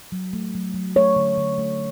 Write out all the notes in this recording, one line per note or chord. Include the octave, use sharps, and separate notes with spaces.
F#3
A3
F#3
F#3
A3 C#5
D3
D3
A3